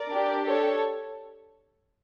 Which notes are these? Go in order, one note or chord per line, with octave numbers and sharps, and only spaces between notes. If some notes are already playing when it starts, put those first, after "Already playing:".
Already playing: A#4 D5
D4 G4
A4 C#5